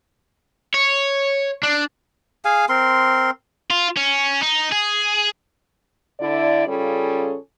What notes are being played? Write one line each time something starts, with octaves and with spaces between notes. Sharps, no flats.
C#5
D4
G#4 F5 G#5
C4 A#4 C6
F4
C#4
D#4
G#4
D3 E4 D5
C#3 G3 C#4 F4 G#4 A4